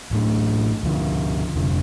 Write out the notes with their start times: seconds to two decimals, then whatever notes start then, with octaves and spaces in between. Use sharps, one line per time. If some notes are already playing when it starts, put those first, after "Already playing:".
0.11 A1 A2 A3 D4
0.83 D2 D3 F3
1.56 F1 F2 D3